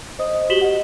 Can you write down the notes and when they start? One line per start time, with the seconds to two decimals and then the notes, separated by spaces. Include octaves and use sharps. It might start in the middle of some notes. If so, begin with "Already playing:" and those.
0.19 C5 D#5 D#6
0.49 F#4 G4 B6 E7 F#7 G7
0.61 D#5 F#5